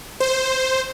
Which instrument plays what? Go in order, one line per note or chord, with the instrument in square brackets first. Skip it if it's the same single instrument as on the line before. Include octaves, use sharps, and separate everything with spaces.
[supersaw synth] C5